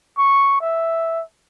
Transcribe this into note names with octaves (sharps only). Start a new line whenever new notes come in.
C#6
E5